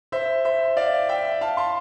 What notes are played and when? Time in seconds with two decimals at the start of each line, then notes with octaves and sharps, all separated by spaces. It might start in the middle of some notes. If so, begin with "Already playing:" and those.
0.12 C5 E5
0.45 C5 E5
0.76 D5 F5
1.09 E5 G5
1.41 F5 A5
1.57 A5 C6